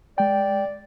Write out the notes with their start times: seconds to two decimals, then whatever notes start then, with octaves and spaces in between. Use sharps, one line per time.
0.18 G#3 D5 G5